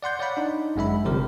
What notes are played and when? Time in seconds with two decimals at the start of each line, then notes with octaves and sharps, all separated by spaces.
0.03 D5 F#5 C6 G6
0.19 C#5 D5 F5 F#5 B5
0.37 D4 D#4
0.76 G1 F#2 G#3 E5 B5
1.05 G1 C3 F3 G3 A#4